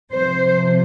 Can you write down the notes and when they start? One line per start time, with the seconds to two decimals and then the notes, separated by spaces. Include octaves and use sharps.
0.11 C3 F3 C5